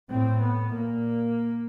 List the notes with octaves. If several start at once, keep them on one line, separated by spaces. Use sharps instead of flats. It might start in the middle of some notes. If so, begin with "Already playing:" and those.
A2 C4
B3
A#2 A#3